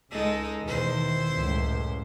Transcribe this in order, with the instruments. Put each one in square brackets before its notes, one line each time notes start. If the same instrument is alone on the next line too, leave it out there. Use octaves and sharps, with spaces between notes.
[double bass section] C#2 [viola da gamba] G#3 D#4 A4
[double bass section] E2 B2 D#3 [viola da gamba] E4 C5
[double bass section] C#2 F#2 A2